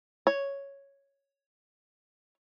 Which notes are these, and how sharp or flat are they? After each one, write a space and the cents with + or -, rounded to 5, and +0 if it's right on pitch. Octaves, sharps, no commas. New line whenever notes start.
C#5 +0